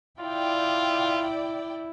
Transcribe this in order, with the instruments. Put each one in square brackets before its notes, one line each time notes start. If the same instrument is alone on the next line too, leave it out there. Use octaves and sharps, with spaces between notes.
[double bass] E4 [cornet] F4 [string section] D5 G5